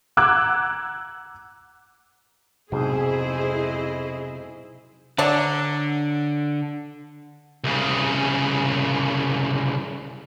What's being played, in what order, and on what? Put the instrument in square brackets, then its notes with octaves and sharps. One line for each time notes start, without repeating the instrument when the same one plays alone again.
[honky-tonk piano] F#5 A#5 D6 E6 F#6 G#6
[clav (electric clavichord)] B1 G#2 [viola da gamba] F2 C5 D#5 [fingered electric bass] C3 [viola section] E4 G#4
[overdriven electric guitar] D3 [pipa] F#3 D4
[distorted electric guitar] C2 C#3